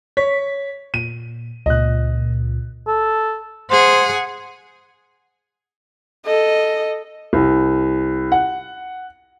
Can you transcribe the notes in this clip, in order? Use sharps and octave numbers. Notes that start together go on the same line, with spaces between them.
C#5 B6
A#2 D#7
C#2 A#2 D#5 F#6
A4
G#4 C5 F#5
A4 D#5
C2
F#5